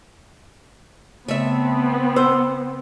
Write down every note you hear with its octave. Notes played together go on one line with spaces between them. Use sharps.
C#3 A3 B3 C4 E5
C5 E6